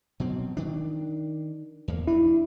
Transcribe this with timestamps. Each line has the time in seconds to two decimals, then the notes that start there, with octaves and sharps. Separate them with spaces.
0.20 B2 F#3 C4
0.57 D#3 D4
1.88 E2 A#3
2.07 D4 E4